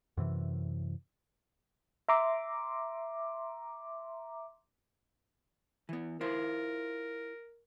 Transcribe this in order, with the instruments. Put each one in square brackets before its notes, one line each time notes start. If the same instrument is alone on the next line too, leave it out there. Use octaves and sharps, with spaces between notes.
[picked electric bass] F#2 C3 E3
[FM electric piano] E5 A#5 C6 D6
[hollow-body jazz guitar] E3 B3
[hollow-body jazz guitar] E4 F4 C5 [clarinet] A#4